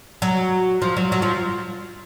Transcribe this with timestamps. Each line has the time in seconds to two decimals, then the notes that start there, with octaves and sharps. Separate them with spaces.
0.22 F#3
0.82 F3
0.97 F#3
1.12 F#3
1.22 F3